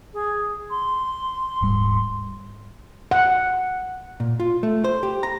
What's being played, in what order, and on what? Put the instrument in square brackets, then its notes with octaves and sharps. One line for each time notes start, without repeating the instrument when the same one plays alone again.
[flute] G#4
C6
[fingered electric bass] D#1 G#2 G3
[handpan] F#5
[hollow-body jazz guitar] A#2
F4
A3
C5
G4
A#5